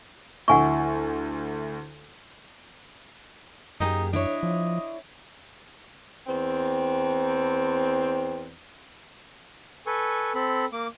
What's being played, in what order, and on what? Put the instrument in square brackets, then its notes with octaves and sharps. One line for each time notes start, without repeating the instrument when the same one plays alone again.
[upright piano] D2 E4 [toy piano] F#5 G#5 C#6
[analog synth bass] F#2 [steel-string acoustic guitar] A#3 G4 G#4 [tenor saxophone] D#4
[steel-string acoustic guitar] D4 E4 C#5 [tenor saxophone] D#5
[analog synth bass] F3
[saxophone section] E2 C4
[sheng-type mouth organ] A4 B4 G#5 C#6
C4 A4 B5
A#3 D6